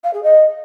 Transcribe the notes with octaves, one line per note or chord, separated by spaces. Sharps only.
F5
G#4
D#5